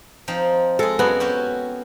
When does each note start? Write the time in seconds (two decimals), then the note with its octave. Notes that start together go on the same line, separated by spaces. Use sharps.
0.28 F3 C4 D#4
0.79 G#3 G#4 A4
0.99 F#2 B3 F#4
1.20 C#4 F#4 G4